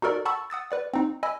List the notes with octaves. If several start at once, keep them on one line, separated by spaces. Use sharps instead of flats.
D#4 F#4 A4 A#4 D5
F#5 A5 B5 C#6 E6
F#5 D#6 E6 A6
B4 D5 F#5
C4 D#4
D#5 G#5 B5 E6